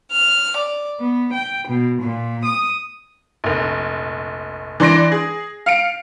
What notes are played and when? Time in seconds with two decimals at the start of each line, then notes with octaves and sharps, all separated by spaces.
0.11 F6
0.55 D5
0.99 B3
1.32 G5
1.67 B2
2.00 A#2
2.44 D#6
3.44 F1 A#1
4.80 E3 D4 C6 A#6 D7
5.12 G#4
5.66 F5 C#7 D7